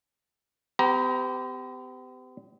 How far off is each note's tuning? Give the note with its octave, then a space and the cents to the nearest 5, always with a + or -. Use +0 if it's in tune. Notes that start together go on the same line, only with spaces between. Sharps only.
C4 -45 G4 +0 A#5 +30